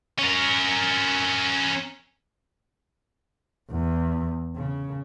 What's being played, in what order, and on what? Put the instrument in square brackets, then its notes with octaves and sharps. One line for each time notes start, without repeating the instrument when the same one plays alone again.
[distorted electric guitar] C#4 A#4
[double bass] E2
C#3